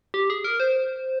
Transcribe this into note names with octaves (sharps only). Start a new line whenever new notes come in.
G4
G#4
A#4
C5